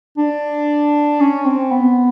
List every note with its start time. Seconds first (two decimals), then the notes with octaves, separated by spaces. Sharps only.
0.17 D4
1.20 C#4
1.45 C4
1.71 B3